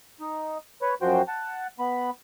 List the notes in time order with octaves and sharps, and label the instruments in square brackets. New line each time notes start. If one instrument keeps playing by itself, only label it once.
[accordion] D#4
B4 C#5
F#2 F3 F#4 C5 G5
F#5 A5
B3 B5